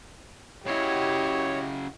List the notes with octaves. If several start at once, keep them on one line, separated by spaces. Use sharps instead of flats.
C#3 F#3 E4 G4 C#5 D#5